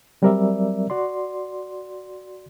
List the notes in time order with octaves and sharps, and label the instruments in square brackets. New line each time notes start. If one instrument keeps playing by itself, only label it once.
[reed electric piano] F#3 G3 C4 A#4 D5 E5
F#4 D5 C6